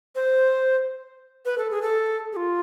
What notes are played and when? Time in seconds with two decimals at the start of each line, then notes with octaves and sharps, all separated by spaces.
0.16 C5
1.45 B4
1.58 A4
1.71 G#4
1.82 A4
2.33 G#4
2.36 F4